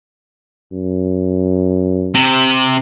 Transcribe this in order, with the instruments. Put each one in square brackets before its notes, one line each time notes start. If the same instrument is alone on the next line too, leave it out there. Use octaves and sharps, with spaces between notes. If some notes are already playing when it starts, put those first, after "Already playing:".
[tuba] F#2
[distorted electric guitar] C3